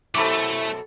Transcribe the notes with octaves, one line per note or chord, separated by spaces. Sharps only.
F#2 B2 A3 E4 A4 B5 C#6 D6